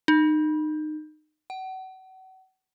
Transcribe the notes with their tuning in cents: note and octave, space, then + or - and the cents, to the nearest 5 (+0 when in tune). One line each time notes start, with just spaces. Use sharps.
D#4 -25
F#5 +35